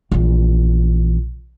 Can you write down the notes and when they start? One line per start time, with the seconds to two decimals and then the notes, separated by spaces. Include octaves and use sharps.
0.12 A#1 E3